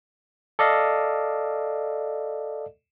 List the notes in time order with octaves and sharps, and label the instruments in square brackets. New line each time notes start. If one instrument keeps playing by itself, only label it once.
[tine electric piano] A4 D5 D#5 F5